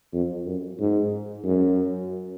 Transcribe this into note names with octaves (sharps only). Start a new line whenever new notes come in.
F2
F#2
G#2
F#2